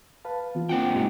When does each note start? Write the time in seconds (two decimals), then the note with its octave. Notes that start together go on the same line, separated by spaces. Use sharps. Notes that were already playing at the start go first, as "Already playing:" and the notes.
0.25 B4 F5 A5
0.55 E3 B3 F4
0.69 A#3 C4 D4 F4 F#5 G5
0.90 G#3 D#4 G4